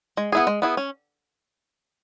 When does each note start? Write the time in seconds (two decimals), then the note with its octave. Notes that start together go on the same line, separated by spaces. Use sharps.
0.17 G#3
0.32 B3 E4 G#4
0.47 G#3
0.62 B3 E4 G#4
0.77 C#4